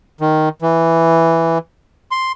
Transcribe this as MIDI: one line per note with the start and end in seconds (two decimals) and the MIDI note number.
0.21 0.49 51
0.62 1.58 52
2.11 2.32 84